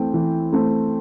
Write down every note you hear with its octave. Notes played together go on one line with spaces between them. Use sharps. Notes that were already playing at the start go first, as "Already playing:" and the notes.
Already playing: E3 A3 C4 G5
E3
A3 C4